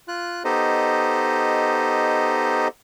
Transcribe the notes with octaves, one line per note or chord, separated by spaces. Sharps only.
F4 F#6
B3 D#4 G4 A4 C5 D#5